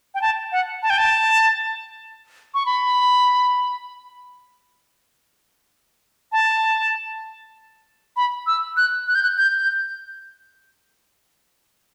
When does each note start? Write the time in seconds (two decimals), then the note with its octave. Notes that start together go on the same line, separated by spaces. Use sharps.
0.15 G5
0.22 A5
0.52 F#5
0.83 A5
0.90 G5
0.98 A5
2.54 C#6
2.66 B5
6.32 A5
8.17 B5
8.47 E6
8.77 F#6
9.08 F#6
9.15 G6
9.23 F#6
9.38 G6
9.57 G6